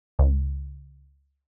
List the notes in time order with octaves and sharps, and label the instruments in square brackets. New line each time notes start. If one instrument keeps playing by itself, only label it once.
[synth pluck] C#2